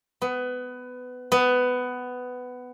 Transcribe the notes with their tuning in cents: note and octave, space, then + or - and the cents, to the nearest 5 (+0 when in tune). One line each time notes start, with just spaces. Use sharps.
B3 +20
B3 +15